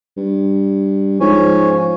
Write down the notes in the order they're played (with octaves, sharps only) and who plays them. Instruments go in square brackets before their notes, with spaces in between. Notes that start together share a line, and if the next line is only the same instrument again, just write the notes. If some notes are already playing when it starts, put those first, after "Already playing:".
[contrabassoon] G2
[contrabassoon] G#2 [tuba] F3 [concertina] C#4